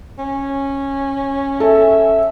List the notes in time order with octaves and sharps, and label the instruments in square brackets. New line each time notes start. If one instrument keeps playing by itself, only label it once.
[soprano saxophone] C#4
[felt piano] A4 [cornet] E5